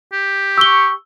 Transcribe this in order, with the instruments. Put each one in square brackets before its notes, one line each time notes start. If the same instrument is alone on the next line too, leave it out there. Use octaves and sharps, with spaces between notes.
[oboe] G4
[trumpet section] C#6 [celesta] E6 G7